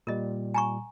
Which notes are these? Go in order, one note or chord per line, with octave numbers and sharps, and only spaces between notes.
A#2 G3 A#4 D#5
G#5 A#5 C#6